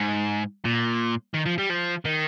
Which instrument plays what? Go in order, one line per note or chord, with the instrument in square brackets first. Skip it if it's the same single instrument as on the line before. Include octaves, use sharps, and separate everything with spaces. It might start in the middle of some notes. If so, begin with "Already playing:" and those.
Already playing: [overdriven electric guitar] G#2
A#2
D#3
F3
G3
F3
D#3